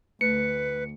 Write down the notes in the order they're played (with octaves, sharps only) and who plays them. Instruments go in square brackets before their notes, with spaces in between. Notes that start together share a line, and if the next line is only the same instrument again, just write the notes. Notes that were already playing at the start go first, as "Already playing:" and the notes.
[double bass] D2 [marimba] A3 [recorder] B4 [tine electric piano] C#7